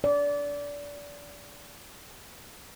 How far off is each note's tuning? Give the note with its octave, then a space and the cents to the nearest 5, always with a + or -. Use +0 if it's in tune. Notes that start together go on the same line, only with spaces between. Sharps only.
D5 -25